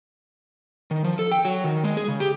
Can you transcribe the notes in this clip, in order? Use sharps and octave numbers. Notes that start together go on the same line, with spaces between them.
D#3
F3
A4
G5
F#3
D#3
G#3
G#4
C#3
G4